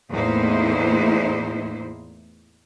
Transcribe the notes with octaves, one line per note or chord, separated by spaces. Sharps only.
E2 A2 A#3 D#4 E4 C5